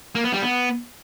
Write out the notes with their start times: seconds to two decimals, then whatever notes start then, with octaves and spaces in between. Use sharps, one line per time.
0.15 A#3
0.24 B3
0.33 G3
0.42 B3